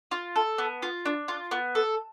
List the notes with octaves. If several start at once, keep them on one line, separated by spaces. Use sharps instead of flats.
F4
A4
B3
F4
D4
F4
B3
A4